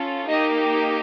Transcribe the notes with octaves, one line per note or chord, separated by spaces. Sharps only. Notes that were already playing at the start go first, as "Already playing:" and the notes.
Already playing: C#4 F4 A4
A#3 D#4 G4 D#5